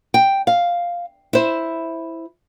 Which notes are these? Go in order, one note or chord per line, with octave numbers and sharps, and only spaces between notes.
G5
F5
E4 C5